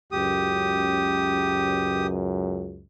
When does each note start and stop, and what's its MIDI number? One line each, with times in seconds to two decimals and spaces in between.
0.12 2.83 37
0.12 2.83 42
0.12 2.07 67
0.12 2.07 87